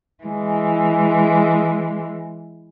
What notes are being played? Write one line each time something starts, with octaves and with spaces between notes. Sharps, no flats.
E3 G#3